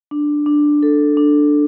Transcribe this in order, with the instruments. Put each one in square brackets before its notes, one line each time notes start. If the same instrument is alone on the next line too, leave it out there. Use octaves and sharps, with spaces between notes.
[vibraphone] D4
D4
A4
D4